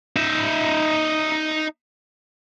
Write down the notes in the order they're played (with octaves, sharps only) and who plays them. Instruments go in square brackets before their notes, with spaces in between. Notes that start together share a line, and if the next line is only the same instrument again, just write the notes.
[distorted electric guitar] D#4 E5